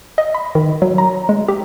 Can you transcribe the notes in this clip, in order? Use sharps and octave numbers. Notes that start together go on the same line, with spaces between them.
D#5
B5
D#3
F#3
A#5
G#3
G4